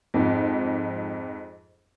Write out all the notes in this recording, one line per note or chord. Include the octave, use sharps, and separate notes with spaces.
F2 G#2